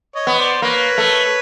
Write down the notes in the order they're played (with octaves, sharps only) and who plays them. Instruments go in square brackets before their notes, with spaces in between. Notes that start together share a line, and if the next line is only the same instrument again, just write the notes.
[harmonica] C#5 D#5
[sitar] B3
[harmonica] C5 D5
[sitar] A#3 [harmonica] B4 C#5
[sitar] A3